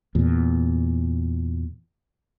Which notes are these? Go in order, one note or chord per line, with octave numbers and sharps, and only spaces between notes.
E2 A#2